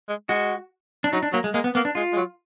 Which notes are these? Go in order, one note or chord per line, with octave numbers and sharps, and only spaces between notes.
G#3
G#3 F#4
D4
F#3 D#4
D4
F#3 A#3
G#3
G#3 A#3
B3
A#3 B3
D4
G#3 F4
G#3
F#3